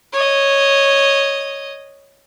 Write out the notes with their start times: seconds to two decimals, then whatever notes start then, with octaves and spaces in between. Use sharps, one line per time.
0.12 C#5 D#5